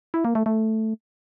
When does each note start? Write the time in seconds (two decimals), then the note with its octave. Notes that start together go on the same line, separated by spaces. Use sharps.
0.14 E4
0.25 A#3
0.35 A3
0.46 A3